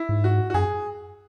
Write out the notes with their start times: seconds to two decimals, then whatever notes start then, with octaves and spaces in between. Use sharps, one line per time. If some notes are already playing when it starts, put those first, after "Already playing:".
Already playing: E4
0.09 G#2
0.24 F#4
0.50 F#4
0.54 F#2 G#4